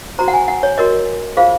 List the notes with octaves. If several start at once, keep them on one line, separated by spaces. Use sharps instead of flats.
F#4 C5 A#5
F#5
G#5
F#5
C#5
F#4 A#4 C#5 D#5
F4 G#4 C5 F5